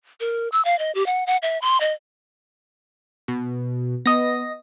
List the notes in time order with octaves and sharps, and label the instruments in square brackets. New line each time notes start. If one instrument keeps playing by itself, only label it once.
[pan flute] A#4
E6
F5
D#5
G4
F#5
F#5
E5
C6
D#5
[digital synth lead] B2
[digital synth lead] B3 [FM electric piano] D#5 A#6